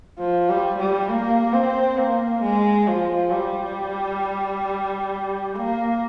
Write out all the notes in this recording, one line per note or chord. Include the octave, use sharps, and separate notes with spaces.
F3
G3
G3
A#3
C4
A#3
G#3
F3
G3
A#3